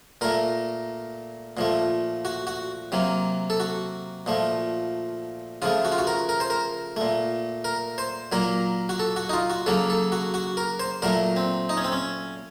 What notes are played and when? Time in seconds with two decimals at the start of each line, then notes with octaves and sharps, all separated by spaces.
0.21 A#2 A3 A#4
1.57 A#2 F3 A3
2.25 F#4
2.47 F#4
2.92 C3 F#3 A#3
3.50 A4
3.60 F#4
4.26 A#2 F3 A3
5.62 C#3 F3 A3 F4
5.85 F#4
5.92 F4
5.98 F#4
6.07 A#4
6.29 A#4
6.40 C5
6.50 A#4
6.97 A#2 A3
7.65 A#4
7.98 C5
8.32 A#2 F#3 A#3 A#4
8.89 F#4
9.00 A4
9.16 F#4
9.29 D#4
9.33 F4
9.50 F#4
9.66 C#3 F#3 A#3 A4
9.90 A4
10.12 F#4
10.34 F#4
10.57 A#4
10.80 C5
11.02 A#2 F#3 A3 A#4
11.36 C4
11.69 D#4
11.77 C#4
11.84 C4
11.92 C#4